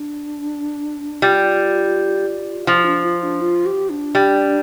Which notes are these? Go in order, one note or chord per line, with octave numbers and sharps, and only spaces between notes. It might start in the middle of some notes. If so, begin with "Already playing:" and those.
Already playing: D4
G3 F4
F3 F4
D4
F4
D4
F4
G4
D4
G3